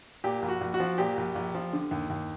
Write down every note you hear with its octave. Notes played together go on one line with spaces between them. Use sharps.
A#2 G4
A#1
F#4
A#1
F#4
F3
A#2 G4
A#1
A#1
F3
D3
D#2
D#2